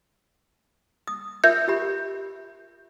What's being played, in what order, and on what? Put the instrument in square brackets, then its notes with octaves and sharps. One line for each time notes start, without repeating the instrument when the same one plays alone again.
[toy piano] D#6
[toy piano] F4 A#4 E5 [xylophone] G6
[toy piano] F4 G4 B5